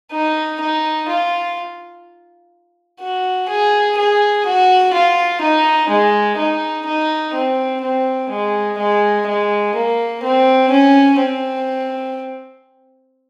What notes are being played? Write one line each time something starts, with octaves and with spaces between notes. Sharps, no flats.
D#4
D#4
F4
F#4
G#4
G#4
F#4
F4
D#4
G#3
D#4
D#4
C4
C4
G#3
G#3
G#3
A#3
C4
C#4
C4